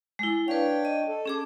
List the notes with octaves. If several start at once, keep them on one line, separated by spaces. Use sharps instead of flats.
G#3 E4
D4 B4 C#5 F5 G5
D#5
A4
C#4 G#4 D6